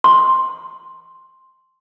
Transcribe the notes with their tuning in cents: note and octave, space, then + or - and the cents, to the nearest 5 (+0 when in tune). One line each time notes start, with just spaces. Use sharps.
C6 +5